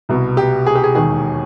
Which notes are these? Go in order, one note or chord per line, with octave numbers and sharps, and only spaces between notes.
C2 B2
G4
G#4
G4
G#4
E1 D#2 D#3 G#4